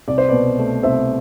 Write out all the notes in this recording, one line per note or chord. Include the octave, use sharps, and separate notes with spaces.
C2 D5
C5
B2 B4 D5
A3
C2 C5 E5